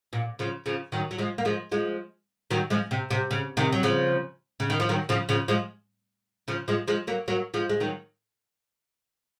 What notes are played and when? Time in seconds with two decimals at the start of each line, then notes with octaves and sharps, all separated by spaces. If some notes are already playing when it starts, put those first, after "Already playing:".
0.13 A#2
0.39 C#3 F3
0.66 C#3 F3
0.92 D#3 F#3
1.11 F#3
1.18 F3 G#3
1.38 A#3
1.45 F3 G#3
1.72 F3 G#3
2.51 D#3 F#3
2.70 F3 G#3
2.91 C3
3.11 C3
3.31 C#3
3.57 C3 D#3
3.72 F#3
3.83 C#3 F3
4.60 C#3
4.70 D#3
4.80 F3
4.89 D#3 F#3
5.09 C#3 F3
5.29 C#3 F3
5.48 F3 G#3
6.48 C#3 F3
6.68 F3 G#3
6.88 F3 G#3
7.07 F#3 A#3
7.28 F#3 A#3
7.54 F3 G#3
7.69 G#3
7.80 D#3 F#3